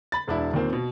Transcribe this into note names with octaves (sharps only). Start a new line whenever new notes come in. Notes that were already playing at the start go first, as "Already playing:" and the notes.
B5 A6
E1 D4 E4
D#2 A#2 A#3 C4
B2